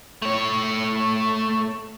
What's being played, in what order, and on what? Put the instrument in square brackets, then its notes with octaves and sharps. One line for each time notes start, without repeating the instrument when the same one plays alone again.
[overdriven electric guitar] A3 C#5